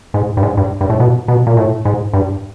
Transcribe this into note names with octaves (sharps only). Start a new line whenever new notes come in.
G#2
G2
G#2
G2
G2
A2
B2
B2
A#2
A2
G#2
G2